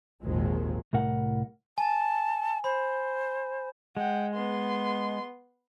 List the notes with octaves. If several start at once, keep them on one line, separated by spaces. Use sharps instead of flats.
G#1 D#2 A#2 D#3 F3 G#3
C2 A2 A#4 F#5
G#5 A5
C5 B5
G#3 F#5 G5
B3 C6